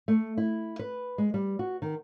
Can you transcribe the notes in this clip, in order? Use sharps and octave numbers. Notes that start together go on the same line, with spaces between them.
A3
E4
B4
G#3
G3
F#4
D#3